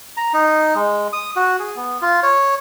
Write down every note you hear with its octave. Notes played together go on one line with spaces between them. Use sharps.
A#5
D#4
G#3
D#6
F#4
G#4
B3
F4
C#5